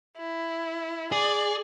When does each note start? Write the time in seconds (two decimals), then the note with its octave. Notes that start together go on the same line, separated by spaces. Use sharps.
0.18 E4
1.12 G#4 D5